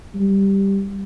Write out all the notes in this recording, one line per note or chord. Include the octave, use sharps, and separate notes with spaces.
G3